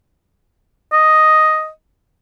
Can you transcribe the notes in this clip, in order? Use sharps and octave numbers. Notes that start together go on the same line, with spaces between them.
D#5